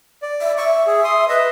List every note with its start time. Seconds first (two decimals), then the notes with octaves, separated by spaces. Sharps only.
0.22 D5
0.41 E5
0.58 E5 C#6
0.87 G#4
1.04 C6 D#6
1.29 B4 D#5 E5